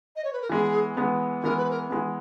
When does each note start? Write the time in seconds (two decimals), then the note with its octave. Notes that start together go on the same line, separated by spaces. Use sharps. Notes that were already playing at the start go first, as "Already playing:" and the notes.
0.15 D#5
0.24 C#5
0.32 B4
0.41 A#4
0.49 E3 G#3 B3 G#4
0.97 E3 G#3 B3
1.43 E3 G#3 B3 A#4
1.57 B4
1.70 A#4
1.90 E3 G#3 B3